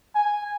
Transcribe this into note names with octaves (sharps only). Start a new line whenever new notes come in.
G#5